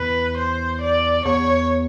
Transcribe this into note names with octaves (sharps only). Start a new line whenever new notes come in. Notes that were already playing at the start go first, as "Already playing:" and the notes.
Already playing: E2 B4
C5
D5
E2 C#5